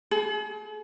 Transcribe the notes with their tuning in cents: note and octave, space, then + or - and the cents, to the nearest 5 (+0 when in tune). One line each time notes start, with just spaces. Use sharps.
G#4 +45